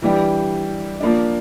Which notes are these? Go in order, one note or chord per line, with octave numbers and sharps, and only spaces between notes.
E3 G3 D4 G4
F3 A#3 D4